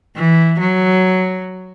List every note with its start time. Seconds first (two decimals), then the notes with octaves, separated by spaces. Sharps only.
0.16 E3
0.60 F#3